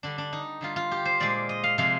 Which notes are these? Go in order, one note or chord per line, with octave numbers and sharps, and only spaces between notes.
D3 G3 D4
D4
D#4
D3 G3 F4
F4
G4
C5
A#2 G#3 D5
D#5
F5
C3 F3 G#3 F5